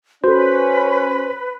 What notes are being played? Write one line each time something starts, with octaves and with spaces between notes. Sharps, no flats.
C#4 F#4 A4 B4 C5